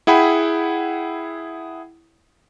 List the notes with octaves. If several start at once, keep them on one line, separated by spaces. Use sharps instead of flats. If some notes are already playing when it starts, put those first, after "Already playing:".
E4 G#4 F#5 G5 B5